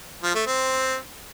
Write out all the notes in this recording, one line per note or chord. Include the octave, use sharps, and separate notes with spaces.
F3
A3
C4